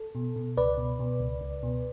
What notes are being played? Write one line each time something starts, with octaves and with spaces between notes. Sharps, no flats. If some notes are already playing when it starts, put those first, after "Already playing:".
Already playing: A4
B2
B2
C#2 B4 D5
B2
B2
C#2
C#2
B2